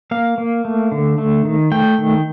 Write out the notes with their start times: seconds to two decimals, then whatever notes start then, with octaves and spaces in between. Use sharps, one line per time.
0.11 A#3 F5
0.38 A#3
0.65 A3
0.92 D3
1.18 A3
1.45 D#3
1.72 A3 G5
1.98 D#3